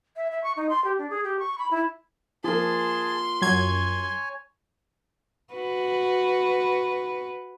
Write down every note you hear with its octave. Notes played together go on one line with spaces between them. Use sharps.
E5
E5
C#6
D#4
C6
G4
D4
G#4
G4
C#6
B5
E4
F3 A#3 G#4 A5 C6
F#2 C#5 G#5 G#6
F#4 B4